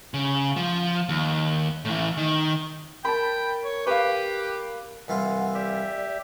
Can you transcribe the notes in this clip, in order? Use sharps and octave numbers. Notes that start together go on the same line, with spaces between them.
C#3
F3
D#2
A2 E3
D#3
A#4 G5 A5 B5
C#5
G4 B4 F5
C2 E3 F4 F#5
G4 D5 E5